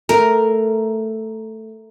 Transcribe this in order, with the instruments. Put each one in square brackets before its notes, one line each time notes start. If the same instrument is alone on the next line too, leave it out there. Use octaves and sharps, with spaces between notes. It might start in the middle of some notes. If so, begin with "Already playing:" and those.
[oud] A3 [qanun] A#4